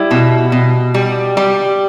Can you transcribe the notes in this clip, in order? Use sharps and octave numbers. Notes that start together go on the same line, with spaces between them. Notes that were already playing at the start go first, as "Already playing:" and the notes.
Already playing: G3 E4
B2
B2
G3
G3